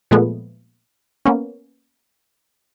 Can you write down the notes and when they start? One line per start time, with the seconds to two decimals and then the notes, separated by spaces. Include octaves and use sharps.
0.11 A#2 F3 G#3 A3 B3
1.25 A#3 B3 C#4